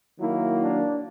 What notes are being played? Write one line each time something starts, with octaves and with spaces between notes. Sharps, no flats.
D#3 F#3 A#3 E4
D4